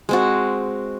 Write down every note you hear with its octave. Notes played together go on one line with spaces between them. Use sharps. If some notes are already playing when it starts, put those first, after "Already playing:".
G#3 C4 F#4